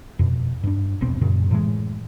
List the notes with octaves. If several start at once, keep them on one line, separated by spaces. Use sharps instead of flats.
F2 B2
G2 D4
E1 A#1 B2 C4
F#2 A#2 C#3
A2 E3 G#3